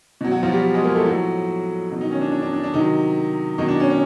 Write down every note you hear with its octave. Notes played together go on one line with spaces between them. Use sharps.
B2 F#3
F#3 F#4
F3 F4
G3 G4
G#3 G#4
A#3 A#4
A3 A4
A2 F3 F#3 F#4
B2 F#3
D#3 D#4
C#4
D4
D4
D4
D4
D4
C3 D#3 F#3 D#4
B2 D#3 F#3 D#4
D4
C#4
C#4